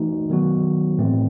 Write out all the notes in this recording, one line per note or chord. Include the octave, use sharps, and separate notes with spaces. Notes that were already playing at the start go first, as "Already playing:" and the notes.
Already playing: E3 A3 D#4 F#4
D#3 F#3 B3 F#4
A2 E3 A3 C4